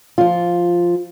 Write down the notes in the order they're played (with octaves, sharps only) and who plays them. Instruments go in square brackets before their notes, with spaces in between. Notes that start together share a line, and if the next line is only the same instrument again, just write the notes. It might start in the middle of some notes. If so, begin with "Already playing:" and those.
[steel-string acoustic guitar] F3 F4